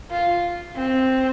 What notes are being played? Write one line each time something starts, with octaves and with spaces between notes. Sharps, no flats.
F4
C4